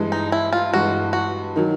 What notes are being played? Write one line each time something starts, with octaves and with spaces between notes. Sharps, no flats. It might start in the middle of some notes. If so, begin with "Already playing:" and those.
Already playing: G2 E3 G#3
D#4
E4
F4
G2 E3 G#3 F#4
F#4
D#3 F#3